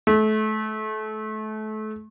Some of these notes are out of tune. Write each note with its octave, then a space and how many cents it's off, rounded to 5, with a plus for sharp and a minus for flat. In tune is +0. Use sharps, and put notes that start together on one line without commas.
A3 -30